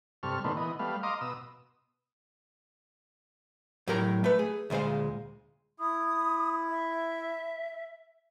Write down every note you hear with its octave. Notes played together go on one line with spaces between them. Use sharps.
G2 C3 A4 C#6 F6
A#2 D3 D#3 A3 B3 C4
E3 B3 D#5
G3 A3 B3 F5
D#5 F5 A#5 C6 D6 D#6
B2 D#6 E6
A2 F#3 G4 A#4 A#5
A3 B4
G#4
D2 A#2 G#3 C5 F5
E4 D#6
E5